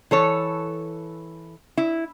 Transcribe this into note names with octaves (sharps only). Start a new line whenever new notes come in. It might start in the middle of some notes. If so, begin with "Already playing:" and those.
E3 A4 C#5
E4